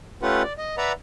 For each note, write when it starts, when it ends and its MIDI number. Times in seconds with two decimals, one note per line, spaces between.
0.22 0.43 57
0.22 0.43 61
0.22 0.43 65
0.22 0.43 67
0.22 0.43 71
0.22 0.43 78
0.43 0.53 74
0.58 0.76 75
0.78 0.92 71
0.78 0.92 74
0.78 0.92 76
0.78 0.92 78
0.78 0.92 82
0.78 0.92 83